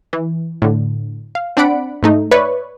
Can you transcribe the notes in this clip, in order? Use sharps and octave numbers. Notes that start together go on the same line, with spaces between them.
E3
A2 D3
F5
C4 D4 D5 F#5 B5 D7
G#2 A3 D#4
B4 C#5 D5 E5 C#6